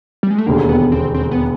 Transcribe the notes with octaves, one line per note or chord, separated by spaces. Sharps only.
G3
G#3
A3
E1 D#2 D3 A#3
B3
C4
C4
B3